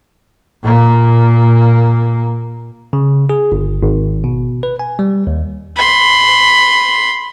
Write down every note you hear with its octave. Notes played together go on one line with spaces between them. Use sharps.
A#2 A#3
C#3
G#4
G1
G#1
B2
B4
G#5
G3
D#2
B5 C6